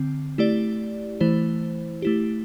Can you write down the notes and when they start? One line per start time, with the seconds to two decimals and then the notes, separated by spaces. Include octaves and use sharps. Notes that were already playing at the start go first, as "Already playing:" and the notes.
Already playing: D3 C4
0.38 A3 E4 G4 D5
1.20 E3 A3 E4 C5
2.02 A3 E4 G4